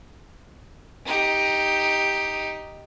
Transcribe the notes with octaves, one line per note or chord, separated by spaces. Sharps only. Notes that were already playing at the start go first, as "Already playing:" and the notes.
D#4 G4